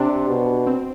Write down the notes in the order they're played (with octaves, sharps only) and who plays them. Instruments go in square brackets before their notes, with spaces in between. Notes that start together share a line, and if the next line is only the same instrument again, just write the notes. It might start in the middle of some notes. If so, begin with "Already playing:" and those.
Already playing: [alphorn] C3 [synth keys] D4
[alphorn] B2
[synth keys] C4